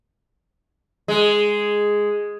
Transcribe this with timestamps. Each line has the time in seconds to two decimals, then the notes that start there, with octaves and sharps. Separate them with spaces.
1.08 G#3